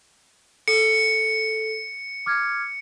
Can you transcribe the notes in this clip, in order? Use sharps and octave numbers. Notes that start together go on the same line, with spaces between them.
A4 C#7
D6 F6 G#6